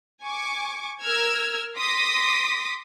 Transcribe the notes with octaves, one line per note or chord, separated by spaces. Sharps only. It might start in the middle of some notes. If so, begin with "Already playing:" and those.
G#5 C#6 D6
A#4 E6 F6 G#6
C6 D6 D#6 A#6 B6